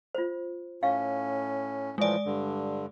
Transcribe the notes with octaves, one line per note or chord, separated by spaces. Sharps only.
F4 C5
A2 C#4 F5 C#6
A2 E3 F3 G#3 D5
G2 D3